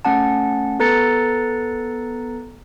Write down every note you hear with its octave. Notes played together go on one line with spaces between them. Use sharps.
A3 C#4 F#5 A5
B3 A4 B4 A#5 A6 C#7